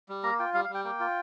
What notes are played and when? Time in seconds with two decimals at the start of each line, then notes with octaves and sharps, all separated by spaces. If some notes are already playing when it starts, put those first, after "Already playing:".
0.09 G3
0.23 A#3 A#5
0.39 F4 G5
0.54 G3 F5
0.64 F5
0.69 G3
0.74 G5
0.84 A#3 G5
1.00 F4